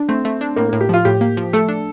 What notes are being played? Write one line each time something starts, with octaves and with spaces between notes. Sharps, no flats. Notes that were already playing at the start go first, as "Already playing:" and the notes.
Already playing: D4
A3 C4
A3
D4
A2 A#3
A2 A#3
G4
F3 F4
A2 G4
A#3
F3
A3 A4
D4